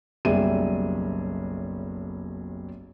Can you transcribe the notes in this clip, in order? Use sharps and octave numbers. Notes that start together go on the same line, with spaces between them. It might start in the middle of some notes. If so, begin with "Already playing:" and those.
F#1 B1 G3 G#4 E5 D#7